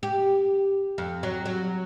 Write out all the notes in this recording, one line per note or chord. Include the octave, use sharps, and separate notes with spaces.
G4
F2
F#3
F#3